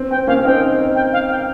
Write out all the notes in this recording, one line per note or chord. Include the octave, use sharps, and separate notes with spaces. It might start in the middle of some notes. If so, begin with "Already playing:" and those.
Already playing: C4
C4 G5
A#3 C#4 F5
C4 D#4 G5
G5
F5
G5